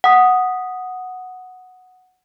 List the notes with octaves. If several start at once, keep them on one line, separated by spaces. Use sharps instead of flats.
F#5 D#6